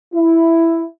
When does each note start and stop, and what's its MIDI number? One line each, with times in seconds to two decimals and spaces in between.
0.14 0.83 64